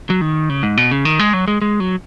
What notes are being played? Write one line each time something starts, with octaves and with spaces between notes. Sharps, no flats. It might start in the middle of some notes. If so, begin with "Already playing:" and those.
F#3
D#3
C#3
G#2
B2
C#3
D#3
G#3
F#3
G#3
G#3
F#3